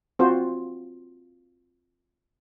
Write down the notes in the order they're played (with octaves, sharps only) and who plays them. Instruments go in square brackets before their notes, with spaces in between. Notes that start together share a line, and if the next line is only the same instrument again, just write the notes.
[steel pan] C4 F4 F#4 C5